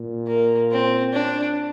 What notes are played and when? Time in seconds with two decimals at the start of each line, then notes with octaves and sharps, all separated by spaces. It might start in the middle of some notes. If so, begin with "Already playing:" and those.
Already playing: A#2
0.27 A#3
0.71 C4
1.13 D4